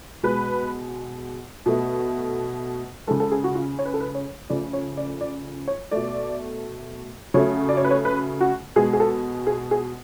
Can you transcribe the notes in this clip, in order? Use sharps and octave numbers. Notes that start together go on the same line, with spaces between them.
B2 G#3 B4
B2 A3
C#3 G#3 A4
A4
G#4
F#4
F4
C#5
B4
A4
B4
C#5
C#3 F3 A3 D5
C#5
D5
D5
C#5
B2 A3 D5
C#3 F#3 A3 C#5
D5
C#5
B4
C#5
B4
F#4
B2 G#3 G#4
G#4
A4
G#4
G#4